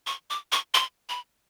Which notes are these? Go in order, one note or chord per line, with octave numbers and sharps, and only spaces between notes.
C#6
D6
C#6
C6
B5